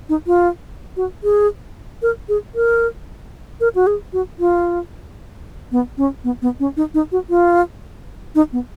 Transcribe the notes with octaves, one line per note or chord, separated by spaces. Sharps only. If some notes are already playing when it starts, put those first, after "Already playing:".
D#4
F4
F#4
G#4
A#4
G#4
A#4
A#4
F#4
G#4
F#4
F4
B3
C#4
B3
B3
C#4
D#4
D#4
F#4
F4
D#4
B3